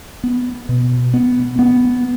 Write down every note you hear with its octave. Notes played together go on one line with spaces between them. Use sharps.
B3
B2
B3
B3